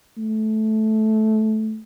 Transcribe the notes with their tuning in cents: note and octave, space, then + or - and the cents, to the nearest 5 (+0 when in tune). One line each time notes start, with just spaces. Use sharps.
A3 -15